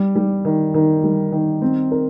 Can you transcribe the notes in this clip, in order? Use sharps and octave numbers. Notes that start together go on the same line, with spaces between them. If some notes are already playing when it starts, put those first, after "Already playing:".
Already playing: G3
G3
D#3
D#3
G3
D#3
C4
A#4